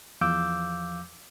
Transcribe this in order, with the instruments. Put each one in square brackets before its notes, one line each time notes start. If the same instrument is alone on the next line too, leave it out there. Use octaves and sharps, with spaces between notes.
[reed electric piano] E2 F3 F5 D6 E6 G6